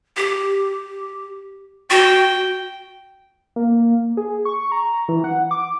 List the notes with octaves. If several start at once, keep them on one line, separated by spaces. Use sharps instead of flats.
G4
F#4 G5
A#3
G#4
C#6
A#5
E3
F#5
D6